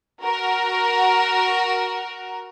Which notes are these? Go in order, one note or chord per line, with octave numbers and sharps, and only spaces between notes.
F#4 A#4